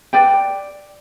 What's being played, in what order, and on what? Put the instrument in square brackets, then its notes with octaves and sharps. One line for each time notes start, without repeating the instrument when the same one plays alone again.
[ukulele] B4 D5 G5